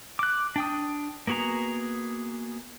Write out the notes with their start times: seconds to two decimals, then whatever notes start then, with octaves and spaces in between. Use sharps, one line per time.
0.19 D6 F#6
0.56 D4 G5 D#6
1.27 A#3 B3 F#4 G#4 A#5